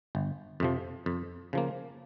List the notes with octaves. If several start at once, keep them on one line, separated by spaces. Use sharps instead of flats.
G1
F2 C3 F3
F2
C#3 F3 A#3